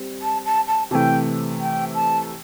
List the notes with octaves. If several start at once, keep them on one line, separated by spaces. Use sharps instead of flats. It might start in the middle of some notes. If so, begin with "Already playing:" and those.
Already playing: G3 C4
A5
A5
A5
C3 E3 A3 G5 A5
G5
A5